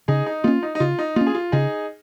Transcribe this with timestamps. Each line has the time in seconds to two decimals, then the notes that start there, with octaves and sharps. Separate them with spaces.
0.08 C#3 D#4 G#4
0.26 D#4
0.44 A#3 C#4 F4
0.63 D#4
0.75 D#4
0.80 C#3 F4
0.99 D#4
1.16 A#3 C#4 F4
1.26 G#4
1.35 F4
1.52 C#3 D#4 G#4